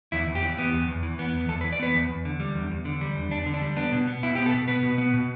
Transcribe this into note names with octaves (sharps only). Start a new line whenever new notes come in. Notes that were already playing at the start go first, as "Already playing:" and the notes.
E2 E4
E2
G4
E3
B3
E2
E2
E3
B3
E2
E2 A4
B4
E3
D5
B3 B4
E2
E2
D3
G3
E2
E2
D3
G3
E2
E2 D4
D3
D4
G3
B3 D4
B2
B3
B2 E4
B3 G4
A4
B2
B3 B4
B2
B3
B2